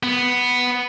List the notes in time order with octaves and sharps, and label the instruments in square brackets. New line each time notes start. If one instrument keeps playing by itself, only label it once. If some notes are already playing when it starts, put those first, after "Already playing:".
[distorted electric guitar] B3